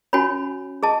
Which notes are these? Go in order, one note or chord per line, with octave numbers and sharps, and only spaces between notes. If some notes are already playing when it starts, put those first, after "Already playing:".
C#4 F#4 C#5 G#5 B5
G#4 D#5 A5